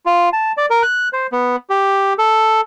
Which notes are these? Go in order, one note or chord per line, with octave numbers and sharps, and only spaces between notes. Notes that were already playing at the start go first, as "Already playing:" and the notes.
F4
A5
D5
A#4
F#6
C5
B3
G4
A4